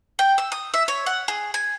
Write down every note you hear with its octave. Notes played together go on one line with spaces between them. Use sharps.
G5
E6
D#6
E5
C#5
F#5
G#4
G#5